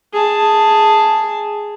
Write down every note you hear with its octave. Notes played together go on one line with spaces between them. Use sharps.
G#4 A5